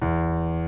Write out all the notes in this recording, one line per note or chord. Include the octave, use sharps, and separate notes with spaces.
E2